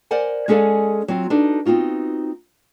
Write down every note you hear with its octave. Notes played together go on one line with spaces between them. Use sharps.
A#4 C5 D5 F#5 G#5
G#3 C#4 G#4 A4 D5 F5
F#3 C4 F4
D4 D#4 F#4 A4 B4
B3 C4 D#4 F4 F#4